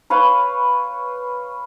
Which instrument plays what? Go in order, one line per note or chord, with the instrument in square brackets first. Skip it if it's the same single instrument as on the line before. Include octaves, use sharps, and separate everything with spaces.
[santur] B4 C#5 F5 B5